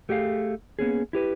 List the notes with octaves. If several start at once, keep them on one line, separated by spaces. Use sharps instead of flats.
A3 G4 G#4 E5 F5
A#3 B3 C#4 G#4
E4 G4 B4